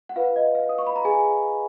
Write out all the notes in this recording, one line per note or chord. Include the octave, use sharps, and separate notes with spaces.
F#5
F4 B4 F5
D#5
F5
D#6
C#6
B5
A#5
G#4 G#5